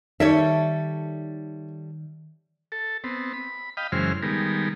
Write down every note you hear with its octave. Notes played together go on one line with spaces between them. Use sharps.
D#3 G3 A4 C#5 E5
A4
B3 C4
B5
D#5 F5 G5 B5
F#2 C#3 E3 G#3 C5 F6
D#3 G3 G#3 B3 A#4